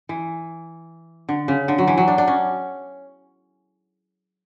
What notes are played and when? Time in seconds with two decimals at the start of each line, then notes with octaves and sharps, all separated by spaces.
0.09 E3
1.29 D3
1.48 C#3
1.68 D3
1.78 F#3
1.88 E3
1.98 F#3
2.08 D4
2.18 D4
2.27 C#4